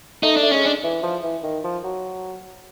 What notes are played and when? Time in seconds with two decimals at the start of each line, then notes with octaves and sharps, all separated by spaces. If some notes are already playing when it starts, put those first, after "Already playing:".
0.23 A3 D#4
0.37 D4
0.43 A3
0.51 G#3 C#4
0.66 D4
0.84 E3
1.03 F3
1.23 E3
1.44 D#3
1.64 F3
1.84 F#3